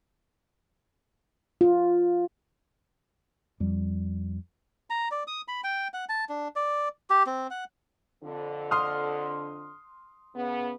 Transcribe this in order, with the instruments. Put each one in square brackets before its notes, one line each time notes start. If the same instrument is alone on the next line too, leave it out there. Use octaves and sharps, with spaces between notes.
[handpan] F4
[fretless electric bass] F2 G3
[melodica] A#5
D5
D#6
B5
G5
F#5
A5
D4
D5
G4
C4
F#5
[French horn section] F2 D3
[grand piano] C6 D#6 F6
[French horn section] C#3 B3